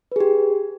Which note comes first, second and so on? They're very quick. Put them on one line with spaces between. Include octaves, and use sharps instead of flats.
B4 G#4 G4